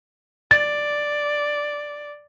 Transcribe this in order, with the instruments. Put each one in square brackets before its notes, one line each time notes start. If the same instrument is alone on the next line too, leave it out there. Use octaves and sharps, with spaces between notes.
[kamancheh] D5 [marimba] A6